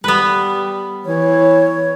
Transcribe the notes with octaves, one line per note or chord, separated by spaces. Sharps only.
G3 B3 B4
E3 C#5